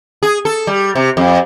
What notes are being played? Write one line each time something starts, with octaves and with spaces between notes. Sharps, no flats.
G#4
A4
G3
C3
F2